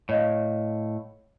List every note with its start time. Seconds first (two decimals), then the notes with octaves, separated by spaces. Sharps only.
0.09 A2 C#5 D#5 F5